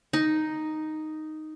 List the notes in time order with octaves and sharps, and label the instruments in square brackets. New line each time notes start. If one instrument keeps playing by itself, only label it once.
[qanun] D#4